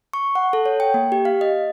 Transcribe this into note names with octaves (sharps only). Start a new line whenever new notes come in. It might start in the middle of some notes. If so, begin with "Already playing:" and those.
C#6
F#5
A4
C#5
G5
A#3
G4
F5
D#5